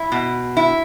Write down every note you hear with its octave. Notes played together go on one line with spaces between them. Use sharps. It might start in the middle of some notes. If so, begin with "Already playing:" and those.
Already playing: E4
B2
E4